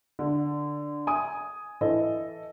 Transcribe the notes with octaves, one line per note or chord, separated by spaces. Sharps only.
D3
G#5 D#6
E3 A4 D#5